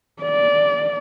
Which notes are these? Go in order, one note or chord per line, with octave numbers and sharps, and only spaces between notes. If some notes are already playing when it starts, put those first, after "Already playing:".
D5